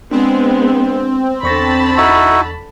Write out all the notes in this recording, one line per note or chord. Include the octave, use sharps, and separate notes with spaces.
G#3 B3 C4 D4
E2 D3 A5 B5 C#6 A#6
D#4 E4 F#4